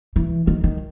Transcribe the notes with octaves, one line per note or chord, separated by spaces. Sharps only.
E3
D#3
D#3